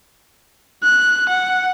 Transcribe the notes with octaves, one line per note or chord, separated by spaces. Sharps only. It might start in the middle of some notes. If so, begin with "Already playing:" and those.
F#6
F#5